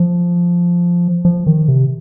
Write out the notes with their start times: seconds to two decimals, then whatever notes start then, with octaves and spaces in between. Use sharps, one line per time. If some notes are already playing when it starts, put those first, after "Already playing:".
Already playing: F3
1.25 F3
1.47 D#3
1.68 C3